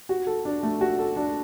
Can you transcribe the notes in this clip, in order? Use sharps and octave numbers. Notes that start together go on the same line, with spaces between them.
F#4
A4
D4
A3
F#4
A4
D4